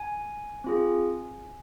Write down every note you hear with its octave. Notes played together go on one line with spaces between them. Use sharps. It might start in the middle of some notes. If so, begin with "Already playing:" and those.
Already playing: G#5
C4 F4 G#4